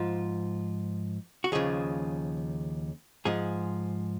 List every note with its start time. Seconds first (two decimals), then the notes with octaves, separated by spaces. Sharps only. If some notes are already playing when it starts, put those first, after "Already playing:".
Already playing: G#2 F3 F4
1.44 F#4
1.52 D#2 C#3 F3 G#4
3.25 G#2 F3 G#4